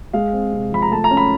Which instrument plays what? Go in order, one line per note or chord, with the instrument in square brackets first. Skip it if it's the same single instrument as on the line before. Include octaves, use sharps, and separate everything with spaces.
[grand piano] G#3 F5
C4
C3
F3 B5
A#5
A3 A5
A#5
C#4
B5